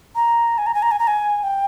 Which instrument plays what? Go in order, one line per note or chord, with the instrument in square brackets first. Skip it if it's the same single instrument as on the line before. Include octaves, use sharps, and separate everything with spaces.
[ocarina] A#5
G#5
A#5
G#5
A#5
G#5
A#5
G#5
G5